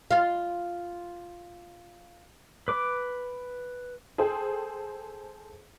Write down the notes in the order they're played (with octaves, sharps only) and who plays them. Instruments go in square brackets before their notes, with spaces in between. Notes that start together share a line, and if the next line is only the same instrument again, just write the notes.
[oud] F4 F5
[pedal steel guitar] B4 D6
[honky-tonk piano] G#4 A4 C5 G5